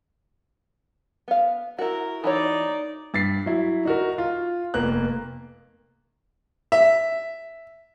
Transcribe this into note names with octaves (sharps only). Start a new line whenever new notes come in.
B3 F5
E4 F#4 A#4
E3 D#4 F#4 C#5 D5
G2 A6 B6 C7
F#3 E4
D#4 F#4 A#4
F4
F1 A#3 B3 F#6
E5